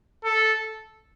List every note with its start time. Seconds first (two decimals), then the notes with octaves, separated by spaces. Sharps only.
0.25 A4